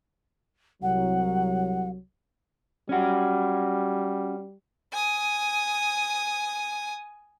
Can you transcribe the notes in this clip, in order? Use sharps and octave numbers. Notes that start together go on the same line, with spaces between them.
C2 F#3 F#5
G3 C#4 F#4
G#5 D#6